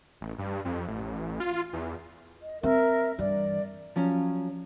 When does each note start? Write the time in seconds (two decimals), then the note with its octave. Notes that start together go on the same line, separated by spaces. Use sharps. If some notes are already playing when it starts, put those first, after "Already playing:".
0.21 A1
0.38 G2
0.65 F2
0.88 A1
1.40 F4
1.73 E2
2.41 D#5
2.63 C4 A#4 E5
3.19 G2 E3 D5
3.96 F3 F#3 C#4